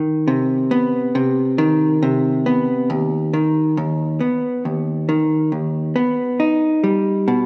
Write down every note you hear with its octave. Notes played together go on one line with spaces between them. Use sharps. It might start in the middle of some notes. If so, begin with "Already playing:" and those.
Already playing: D#3
C3
B3
C3
D#3
C3
B3
D#2
D#3
D#2
B3
D#2
D#3
D#2
B3
D#4
G3
B2